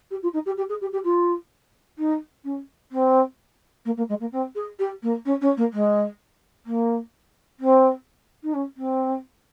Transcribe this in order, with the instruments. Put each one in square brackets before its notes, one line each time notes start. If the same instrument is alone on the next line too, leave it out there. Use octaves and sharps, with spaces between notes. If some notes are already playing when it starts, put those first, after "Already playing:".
[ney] G4
F4
D#4
G4
G4
G#4
G4
G4
F4
D#4
C#4
C4
A#3
A#3
G#3
A#3
C4
G#4
G4
A#3
C#4
C#4
A#3
G#3
A#3
C4
D#4
C#4
C4